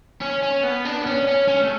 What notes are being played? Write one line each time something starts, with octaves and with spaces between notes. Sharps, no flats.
C#4
C#4
B3
D4
B3
C#4
C#4
C#4
A3